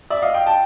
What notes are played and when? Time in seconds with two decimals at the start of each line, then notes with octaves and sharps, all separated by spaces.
0.10 D5 E5
0.22 D#5 F5
0.34 F5 G5
0.46 G5 A5